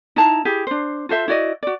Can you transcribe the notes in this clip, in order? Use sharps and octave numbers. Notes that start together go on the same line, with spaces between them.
D#4 E4 A5 A#5
E4 G4 G#4
D4 C5
F4 A4 C5 E5
E4 F#4 D5 D#5
F#4 D5